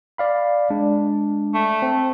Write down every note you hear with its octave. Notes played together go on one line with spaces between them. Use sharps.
D5 F5 B5
G#3 D4
A3
C4